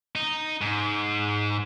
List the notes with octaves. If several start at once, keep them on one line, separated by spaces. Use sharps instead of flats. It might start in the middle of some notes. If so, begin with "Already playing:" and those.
D#4
G#2